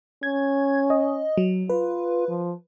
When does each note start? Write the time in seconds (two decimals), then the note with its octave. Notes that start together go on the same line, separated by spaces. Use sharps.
0.23 C#4 G#6
0.90 D#5
1.38 F#3
1.70 F4 B4
2.28 F3